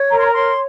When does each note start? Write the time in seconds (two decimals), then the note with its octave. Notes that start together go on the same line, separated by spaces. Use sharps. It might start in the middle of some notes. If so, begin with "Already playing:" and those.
Already playing: C#5
0.10 A#4 A#5
0.17 C6
0.25 A#5
0.33 C#5 C6